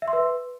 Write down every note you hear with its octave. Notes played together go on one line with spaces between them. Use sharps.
E5
C6
B4